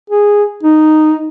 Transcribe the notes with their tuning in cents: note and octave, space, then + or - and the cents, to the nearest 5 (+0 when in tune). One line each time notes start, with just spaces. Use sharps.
G#4 -10
D#4 -5